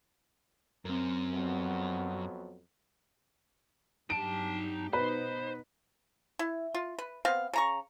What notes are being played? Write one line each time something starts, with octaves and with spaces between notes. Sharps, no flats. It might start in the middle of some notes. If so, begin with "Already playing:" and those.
F#2 C4 A#4
F2 F#3 B3
G2 F#3 D#4 G4 A5 D7
B2 B3 D#4 B4 C5
E4
F4
B4
B3 C4 F5
C#3 A#5 C#6